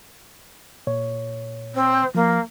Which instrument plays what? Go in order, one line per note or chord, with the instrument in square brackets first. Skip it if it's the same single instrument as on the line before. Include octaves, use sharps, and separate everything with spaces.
[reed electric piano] A#2 C#5
[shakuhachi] C4
[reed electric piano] F3 [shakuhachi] A#3